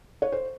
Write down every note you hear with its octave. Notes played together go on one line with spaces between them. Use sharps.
C#5
C5